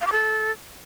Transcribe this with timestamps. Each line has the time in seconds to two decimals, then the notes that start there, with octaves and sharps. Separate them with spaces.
0.01 F5
0.07 D6
0.12 A4